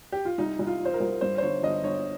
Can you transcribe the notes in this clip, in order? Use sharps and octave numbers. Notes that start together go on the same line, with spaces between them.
G4
F4
C2 D#4
C2
F4
F3
C5
A#4
C2
G2 C5
C5
G1 C#5
G1 D#5
G1 C#5